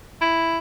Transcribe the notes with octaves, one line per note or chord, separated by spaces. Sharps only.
E4